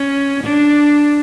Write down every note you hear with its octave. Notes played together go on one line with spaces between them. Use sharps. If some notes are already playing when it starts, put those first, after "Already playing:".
Already playing: C#4
D4